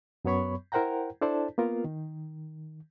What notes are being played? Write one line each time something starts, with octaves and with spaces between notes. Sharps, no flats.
F#2 F#3 B3 C#5 B5 C#6
E4 A#4 C5 F#5 G5 A#5
D4 E4 A4 C5 D5 A5
A#3 B3 F4 A#4
D#3